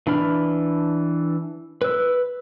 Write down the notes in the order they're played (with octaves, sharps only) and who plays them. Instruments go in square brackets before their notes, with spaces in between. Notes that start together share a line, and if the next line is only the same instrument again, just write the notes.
[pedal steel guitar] E3 D4 B5 F6
B4 E6